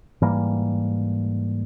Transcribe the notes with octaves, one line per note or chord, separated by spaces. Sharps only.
G#2 E3 G3 A#3